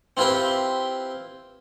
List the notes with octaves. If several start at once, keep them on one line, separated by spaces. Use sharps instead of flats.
C4 E4 F4 G4 B4